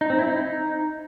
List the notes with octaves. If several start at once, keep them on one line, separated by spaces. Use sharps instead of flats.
D#4
C4
E4
D#4